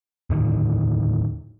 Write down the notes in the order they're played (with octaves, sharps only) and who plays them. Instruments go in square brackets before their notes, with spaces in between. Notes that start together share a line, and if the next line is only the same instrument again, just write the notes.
[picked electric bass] D#2 A2 D3 D#3